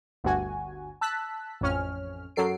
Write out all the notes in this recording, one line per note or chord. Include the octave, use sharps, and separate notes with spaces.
G1 D2 G2 F#4 G#5
A5 E6 F#6 B6
A1 F2 C#4 F6
F#2 F#3 A4 C7 D7